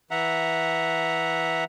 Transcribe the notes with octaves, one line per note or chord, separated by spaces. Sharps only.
E3 E5 F#5 A#5